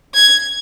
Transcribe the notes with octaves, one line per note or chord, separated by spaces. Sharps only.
G#6